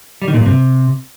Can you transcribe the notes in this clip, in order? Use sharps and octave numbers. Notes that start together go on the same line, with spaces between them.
G3
D#3
A#2
G2
C3